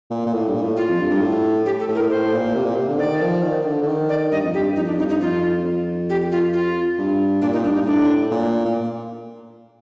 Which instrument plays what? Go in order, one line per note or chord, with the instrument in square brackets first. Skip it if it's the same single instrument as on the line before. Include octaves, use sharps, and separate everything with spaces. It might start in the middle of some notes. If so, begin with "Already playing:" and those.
[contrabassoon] A#2
A#2
A2
G2
A#2
A2
[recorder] F4
[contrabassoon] F2
G2
G2
A2
[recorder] G4
A4
[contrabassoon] A2
[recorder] A#4
[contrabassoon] A2
[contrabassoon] A2 [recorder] C5
[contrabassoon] A#2
C3
A#2
C3
D3
[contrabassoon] D#3 [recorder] D5
[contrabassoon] F3
D#3
D#3
D3
D3
D#3
[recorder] D5
[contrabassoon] G2 [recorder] D#5
[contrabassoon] F2
[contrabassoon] G2 [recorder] G4
[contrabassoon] F2 [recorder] D#4
[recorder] D4
[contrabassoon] G2 [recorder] D#4
[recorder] D#4
[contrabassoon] F2 [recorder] F4
[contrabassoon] F2
[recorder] G4
F4
F4
[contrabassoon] G2
[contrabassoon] A#2 [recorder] D4
[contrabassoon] A#2 [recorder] D#4
[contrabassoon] G2 [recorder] D4
[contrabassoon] G2 [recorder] D#4
[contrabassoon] A2 [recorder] D4
[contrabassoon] A#2
A#2